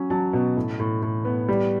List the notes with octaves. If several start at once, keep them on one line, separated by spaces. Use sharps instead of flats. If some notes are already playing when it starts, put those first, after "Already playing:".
Already playing: F#3 C#4
F#3 A5
B2
A2
A2
A2
B3
G3